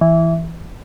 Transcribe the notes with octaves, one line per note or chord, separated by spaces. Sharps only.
E3